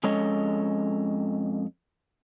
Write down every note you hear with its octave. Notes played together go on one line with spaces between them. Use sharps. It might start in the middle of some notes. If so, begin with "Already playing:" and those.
F2 G#3 C#4 A4 C#5 D#5